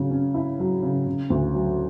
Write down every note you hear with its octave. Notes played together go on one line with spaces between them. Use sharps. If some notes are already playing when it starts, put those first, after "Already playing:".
Already playing: C#3 F#3
C#4
E4
F#3
C#3
C#3
D2
F#3